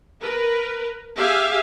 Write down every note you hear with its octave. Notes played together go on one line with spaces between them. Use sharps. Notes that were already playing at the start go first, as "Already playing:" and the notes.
A#4 B4
G4 G#4 E5 F5